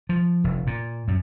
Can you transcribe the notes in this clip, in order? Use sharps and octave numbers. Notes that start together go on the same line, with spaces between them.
F3
F1
A#2
F#2